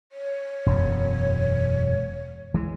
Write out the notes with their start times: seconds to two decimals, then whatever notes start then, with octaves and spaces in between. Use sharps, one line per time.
0.12 C#5
0.66 E1 F#2
2.54 E3 G#3